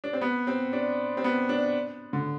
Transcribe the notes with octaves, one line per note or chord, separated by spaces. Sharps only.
D4
C4
B3
C4
D4
C4
B3
D4
D3